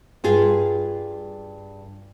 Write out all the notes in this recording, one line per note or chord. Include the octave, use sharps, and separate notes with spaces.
G2 F4 G#4